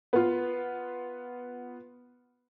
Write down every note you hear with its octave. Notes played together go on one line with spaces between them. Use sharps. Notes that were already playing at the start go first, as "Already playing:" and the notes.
B3 F4